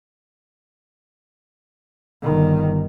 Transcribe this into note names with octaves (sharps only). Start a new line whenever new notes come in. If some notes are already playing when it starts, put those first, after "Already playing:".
G1 D#3